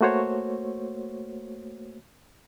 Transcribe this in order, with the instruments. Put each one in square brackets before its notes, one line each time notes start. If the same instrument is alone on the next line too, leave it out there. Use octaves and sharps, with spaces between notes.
[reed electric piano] A3 A#3 F#4 C5 C#5